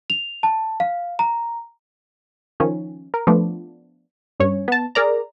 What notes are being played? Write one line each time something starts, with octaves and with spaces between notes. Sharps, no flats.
F7
A5
F5
A#5
D#3 F3 C#4
A#4
F3 A3 B3 D4
G2 C#4 C#5
B3 A5
G#4 A#4 D5 A#5